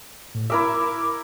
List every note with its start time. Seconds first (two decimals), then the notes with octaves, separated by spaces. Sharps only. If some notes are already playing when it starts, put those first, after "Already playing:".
0.34 A2
0.50 E4 A#4 E5 D6